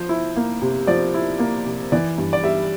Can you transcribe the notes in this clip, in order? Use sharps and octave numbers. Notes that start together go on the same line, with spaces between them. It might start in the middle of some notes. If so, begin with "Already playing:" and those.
Already playing: F3 C5
E4
A#3
C3
F3 D5
E4
A#3
C3
E3 D5
G2
D5
G3 E5